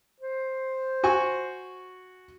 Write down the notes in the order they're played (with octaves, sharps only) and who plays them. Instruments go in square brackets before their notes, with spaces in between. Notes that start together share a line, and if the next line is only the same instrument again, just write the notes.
[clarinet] C5
[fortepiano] F#4 G#5 C#6